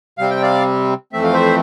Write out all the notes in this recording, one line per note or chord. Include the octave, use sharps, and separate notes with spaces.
C3 G3 C4 F5
G5
D5 F5
F2 E3 A3 C4 E5
F5
C5 E5